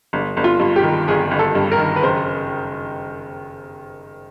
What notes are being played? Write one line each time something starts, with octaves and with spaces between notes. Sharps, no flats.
G1
G1
F4
G2
G4
D#3
G1 G#4
G1
A4
G2
A#4
D#3
B4
F#1 C5